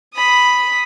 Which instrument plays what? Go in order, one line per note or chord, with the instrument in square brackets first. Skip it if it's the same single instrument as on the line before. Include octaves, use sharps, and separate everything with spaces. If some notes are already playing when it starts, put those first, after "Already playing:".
[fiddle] B5 D#6